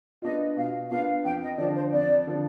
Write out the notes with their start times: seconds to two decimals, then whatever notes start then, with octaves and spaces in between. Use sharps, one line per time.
0.22 B3 D4 F4 D#5
0.56 B2 F5
0.90 B3 D4 F4 F5
1.25 F2 G5
1.42 D#5
1.58 D3 D5
1.61 F3
1.75 C5
1.92 F2 D5
2.27 D3 F3